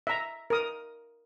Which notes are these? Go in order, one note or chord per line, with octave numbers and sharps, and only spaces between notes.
E5 A#5
A#4 D#6